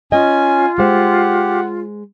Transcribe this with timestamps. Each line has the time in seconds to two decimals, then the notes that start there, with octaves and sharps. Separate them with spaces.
0.12 C#4 F4 D#5 G#5
0.78 G#3 G4 C5 F#5